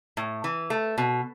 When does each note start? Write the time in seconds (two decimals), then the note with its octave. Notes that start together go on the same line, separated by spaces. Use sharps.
0.17 A2
0.44 E3
0.70 A3
0.98 B2